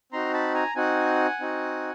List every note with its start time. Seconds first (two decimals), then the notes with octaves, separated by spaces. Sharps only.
0.12 C4 D#4 F#4 A#5 C6
0.33 A5 B5
0.55 G#5 A#5
0.75 C4 D#4 F#4 F#5 G#5
1.40 C4 D#4 F#4